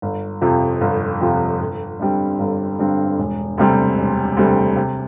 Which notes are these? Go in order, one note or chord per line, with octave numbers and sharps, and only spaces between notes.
G1
F2 C3 F3
G1
F2 C3 F3
G1
G2 D3 G3 C4
G1
G2 D3 G3 C4
E1
D2 C3 G3 C4
E1
D2 C3 G3 C4
C3